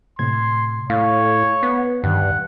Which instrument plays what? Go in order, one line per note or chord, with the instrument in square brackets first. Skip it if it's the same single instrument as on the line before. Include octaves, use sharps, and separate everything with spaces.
[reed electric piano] A2 C3 G#6 [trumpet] C6
[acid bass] A2 [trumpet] C#5 [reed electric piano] F5
[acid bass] B3
[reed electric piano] D2 D#3 [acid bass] G2 [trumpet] F#5